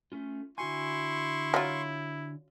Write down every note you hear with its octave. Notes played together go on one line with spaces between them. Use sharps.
A3 C#4 F4
D3 E4 F#4 G#5 C6 C#6
F#3 F4